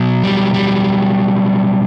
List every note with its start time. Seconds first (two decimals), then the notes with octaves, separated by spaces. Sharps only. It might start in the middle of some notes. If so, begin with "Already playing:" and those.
Already playing: B2 F#3
0.23 G3
0.54 G3